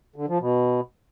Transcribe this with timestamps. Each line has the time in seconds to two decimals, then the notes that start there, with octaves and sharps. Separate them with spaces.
0.16 D3
0.28 F3
0.40 B2